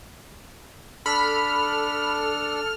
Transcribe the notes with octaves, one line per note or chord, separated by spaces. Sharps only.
D4 A4 B5 F6